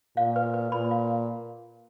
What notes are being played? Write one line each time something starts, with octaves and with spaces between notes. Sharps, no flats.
A#2 F5
B4
B4
A#2 B5
F5